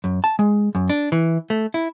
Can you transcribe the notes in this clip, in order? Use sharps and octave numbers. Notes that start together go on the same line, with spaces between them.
F#2
A5
G#3
F#2
D4
E3
A3
E4